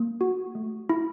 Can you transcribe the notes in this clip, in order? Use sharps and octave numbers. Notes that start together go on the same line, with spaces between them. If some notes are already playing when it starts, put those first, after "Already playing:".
Already playing: A#3
F#4
A3
E4